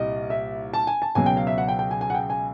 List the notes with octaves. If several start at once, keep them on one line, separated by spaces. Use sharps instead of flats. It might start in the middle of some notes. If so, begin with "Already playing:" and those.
Already playing: C2 A#2 G3 D#5
E5
A5
G#5
A5
C#2 B2 F#3 G#5
G5
F5
E5
F#5
G5
G5
G#5
G#5
F#5
G5
G#5